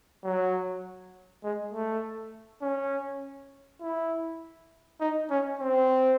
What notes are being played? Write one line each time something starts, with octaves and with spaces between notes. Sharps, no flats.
F#3
G#3
A3
C#4
E4
D#4
C#4
C4